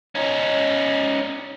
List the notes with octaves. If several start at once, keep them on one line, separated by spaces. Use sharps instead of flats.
C#4 D#4